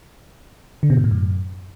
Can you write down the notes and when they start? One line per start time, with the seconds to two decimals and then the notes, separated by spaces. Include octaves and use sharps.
0.83 D3
0.90 B2
0.97 G#2
1.04 A2
1.11 F#2